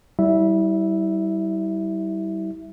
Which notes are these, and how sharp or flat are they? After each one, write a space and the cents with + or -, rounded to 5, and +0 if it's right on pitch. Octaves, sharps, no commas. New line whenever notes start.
G3 -30 E4 -30 E5 +0